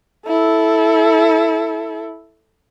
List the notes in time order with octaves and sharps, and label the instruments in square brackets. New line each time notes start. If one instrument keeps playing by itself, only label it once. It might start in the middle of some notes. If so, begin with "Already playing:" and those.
[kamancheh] E4 A4